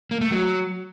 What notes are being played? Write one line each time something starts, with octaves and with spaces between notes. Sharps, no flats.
A#3
A3
F#3